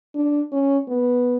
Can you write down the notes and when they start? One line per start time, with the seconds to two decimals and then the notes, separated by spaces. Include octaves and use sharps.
0.15 D4
0.52 C#4
0.88 B3